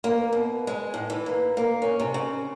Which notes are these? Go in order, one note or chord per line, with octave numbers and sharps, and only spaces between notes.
A#3
B2
G#3
A2
E3
A#3
A#3
C#4
C3
C#3